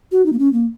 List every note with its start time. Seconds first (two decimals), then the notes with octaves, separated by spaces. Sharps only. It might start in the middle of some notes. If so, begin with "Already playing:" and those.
0.12 F#4
0.26 D#4
0.33 A#3
0.39 C#4
0.53 A#3